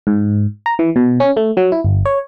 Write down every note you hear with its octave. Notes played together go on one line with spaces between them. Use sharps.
G#2
A#5
E3
B2
C#4
A3
F#3
E4
G1
C#5